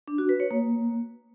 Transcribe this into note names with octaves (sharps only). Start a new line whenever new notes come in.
D4
F#4
B4
C#5
A#3